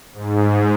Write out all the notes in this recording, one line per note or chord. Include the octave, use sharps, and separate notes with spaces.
G#2